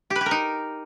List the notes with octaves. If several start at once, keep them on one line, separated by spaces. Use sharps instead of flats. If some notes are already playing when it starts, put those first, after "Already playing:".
G4
B4
G4
A#4
D#4